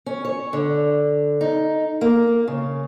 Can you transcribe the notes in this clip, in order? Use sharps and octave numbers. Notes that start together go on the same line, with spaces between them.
C#4
C#5
D3
D#4
A#3
C#3